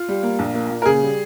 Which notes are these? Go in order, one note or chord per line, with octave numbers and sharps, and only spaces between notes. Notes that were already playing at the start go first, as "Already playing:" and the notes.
Already playing: F4
G3
A#3
A#1
A#3
A#2
A#4
C#3 G#4
G3